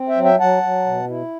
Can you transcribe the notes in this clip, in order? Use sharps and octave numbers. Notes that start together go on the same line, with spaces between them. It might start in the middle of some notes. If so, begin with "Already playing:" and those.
Already playing: C4
E5 G5
F#3
E5 G5
F#3 F#5 A5
F#3
B2
E4